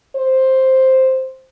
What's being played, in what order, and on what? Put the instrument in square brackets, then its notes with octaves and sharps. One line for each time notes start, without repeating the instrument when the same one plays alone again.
[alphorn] C5